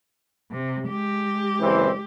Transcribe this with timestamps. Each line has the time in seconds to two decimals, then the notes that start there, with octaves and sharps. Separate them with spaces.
0.51 C3
0.89 G#3 G4
1.60 F#1 E3 C4